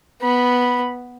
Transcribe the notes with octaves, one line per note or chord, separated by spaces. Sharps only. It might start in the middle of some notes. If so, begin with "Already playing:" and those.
B3 B5